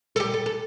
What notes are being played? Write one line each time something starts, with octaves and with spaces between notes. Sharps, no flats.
A4
G4
A4
A4